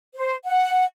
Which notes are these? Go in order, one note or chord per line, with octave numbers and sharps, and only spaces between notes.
C5
F#5